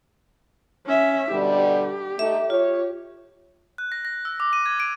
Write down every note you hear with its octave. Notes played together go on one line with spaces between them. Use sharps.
C#4 E5
B2 D3 G3 G4
A3 D#4 E5
F4 C#5
F#6
A#6
A#6
E6
D6
D#7
G#6
D7